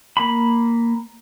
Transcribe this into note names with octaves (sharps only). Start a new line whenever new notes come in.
A#3 B5